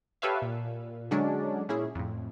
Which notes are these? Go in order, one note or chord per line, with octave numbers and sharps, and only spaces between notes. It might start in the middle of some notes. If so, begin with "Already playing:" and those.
G4 A4 B4 C#5 E5 F5
A#2
D3 F#3 G#3 C#4 D4
A#2 C#4 E4 G#4
F2 A2